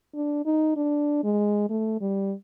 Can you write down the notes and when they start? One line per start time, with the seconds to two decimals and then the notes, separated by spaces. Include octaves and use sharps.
0.14 D4
0.45 D#4
0.76 D4
1.24 G#3
1.70 A3
2.01 G3